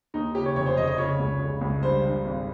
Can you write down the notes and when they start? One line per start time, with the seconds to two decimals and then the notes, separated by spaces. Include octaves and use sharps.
0.14 D#2 D#4
0.35 C#3 G4
0.46 C#5
0.56 F1 C#5
0.66 C5
0.77 F1 D#5
0.88 D#5
0.98 C#3 C#5
1.19 C#2
1.40 C#3
1.61 C#2
1.82 G2 C5
2.03 D#3
2.25 G#1